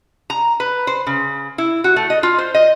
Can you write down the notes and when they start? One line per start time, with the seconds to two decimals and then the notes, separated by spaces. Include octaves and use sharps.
0.30 A#5
0.60 B4
0.87 C5
1.07 C#3
1.58 E4
1.84 F#4
1.96 A3
2.10 D#5
2.23 F4
2.38 C5
2.54 D#5